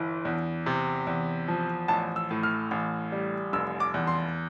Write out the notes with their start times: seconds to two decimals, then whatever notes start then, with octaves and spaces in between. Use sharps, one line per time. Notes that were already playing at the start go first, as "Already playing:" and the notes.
Already playing: G1 E3
0.25 E2
0.66 C3
1.07 E2
1.48 F3
1.88 A1 A5
2.16 E6
2.31 A2
2.43 F6
2.71 A1
3.12 G3
3.53 F1 E6
3.80 D6
3.94 E2
4.07 C6